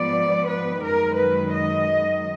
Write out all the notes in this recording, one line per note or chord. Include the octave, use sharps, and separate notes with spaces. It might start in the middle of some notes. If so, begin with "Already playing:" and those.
Already playing: G#2 F3 B3 D5
B4
F#2 D#3 G#3 A#4
B4
D#5